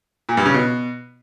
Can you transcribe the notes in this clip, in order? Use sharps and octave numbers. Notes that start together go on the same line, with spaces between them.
A#2
G2
C#3
B2